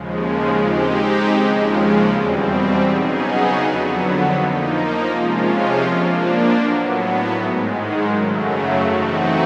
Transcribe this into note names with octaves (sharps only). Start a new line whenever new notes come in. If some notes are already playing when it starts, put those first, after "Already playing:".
Already playing: D#2 C#3 F3 G#3
G#3 C4 D#4 G4
D#2 C#3 F3 G#3
E2 B2 G3 C4
C#3 F#3 B3 D#4 G#4
F2 D3 F#3 B3
F3 A#3 D#4
C3 F3 G#3 C#4 F4
F3 A#3 D4
A2 F#3 B3
G#2 D#3 G#3
F#2 C#3 F#3 A3
E3 A3 C4 D#4 F#4